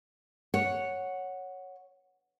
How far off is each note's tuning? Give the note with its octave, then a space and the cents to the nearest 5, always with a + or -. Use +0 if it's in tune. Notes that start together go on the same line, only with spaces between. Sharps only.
C#5 +0 F#5 -5